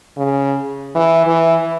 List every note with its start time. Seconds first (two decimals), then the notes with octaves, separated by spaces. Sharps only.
0.17 C#3
0.95 E3
1.27 E3